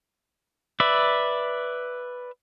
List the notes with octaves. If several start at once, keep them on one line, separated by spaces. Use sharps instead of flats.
B4 D5 E5